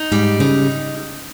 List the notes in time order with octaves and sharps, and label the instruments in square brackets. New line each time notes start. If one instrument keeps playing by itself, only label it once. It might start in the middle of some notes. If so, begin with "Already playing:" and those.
Already playing: [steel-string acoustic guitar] D#4
[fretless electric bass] G#2 [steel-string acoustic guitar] G3
[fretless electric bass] C#3 [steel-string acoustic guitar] D#4